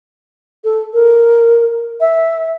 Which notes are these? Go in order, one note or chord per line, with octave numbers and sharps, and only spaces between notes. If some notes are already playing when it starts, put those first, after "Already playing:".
A4
A#4
E5